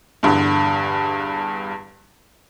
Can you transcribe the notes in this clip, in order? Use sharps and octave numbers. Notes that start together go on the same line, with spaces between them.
E2 G2 D3